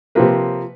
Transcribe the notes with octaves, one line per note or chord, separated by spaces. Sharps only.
C3 F3 A#3 B4